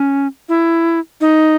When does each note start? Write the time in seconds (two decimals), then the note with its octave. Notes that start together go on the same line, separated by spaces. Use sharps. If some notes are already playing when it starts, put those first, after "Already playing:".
Already playing: C#4
0.49 E4
1.21 D#4